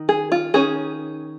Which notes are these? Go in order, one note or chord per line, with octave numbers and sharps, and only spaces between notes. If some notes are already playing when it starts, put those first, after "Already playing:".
Already playing: D#3
G#4
F4
D#3 C#4 G#4